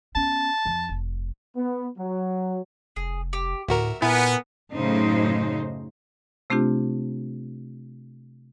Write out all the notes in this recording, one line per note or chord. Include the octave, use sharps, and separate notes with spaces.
B3 C#4 A5
F2 F3
F1
B3
F#3
F1 G#4
G4
D2 A2 F#4 A#4 E5
A#2 B3 E4 A#4 G#5
F#2 A2 C#3 D#4 C5
C3 A3 C4 D4 F4 G4